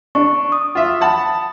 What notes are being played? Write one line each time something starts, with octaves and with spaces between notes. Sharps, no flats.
D4 C#6
D#6
F4 E5
F#5 A5 B5